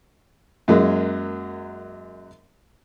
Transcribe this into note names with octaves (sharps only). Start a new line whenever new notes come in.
F#2 F#3 G#3 A#3